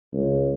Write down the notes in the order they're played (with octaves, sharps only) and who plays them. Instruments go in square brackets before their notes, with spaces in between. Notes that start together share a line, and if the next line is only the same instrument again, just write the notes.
[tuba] C#2